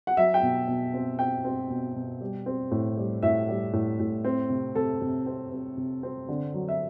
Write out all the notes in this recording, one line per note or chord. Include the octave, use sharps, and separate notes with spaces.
F#5
F#3 E5
G5
B2
B2
C4
C4 G5
C4
B2
B2
G3
C4
A2
G3
A2 E5
G3
A2
A2
C4
C3
C3 A4
C3
C4
C4
C3
C4
D3
F#3
E5